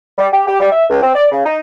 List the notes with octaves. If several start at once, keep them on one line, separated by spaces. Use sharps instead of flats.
G3
G4
G4
G3
E5
C#2
C4
D5
C#3
D#4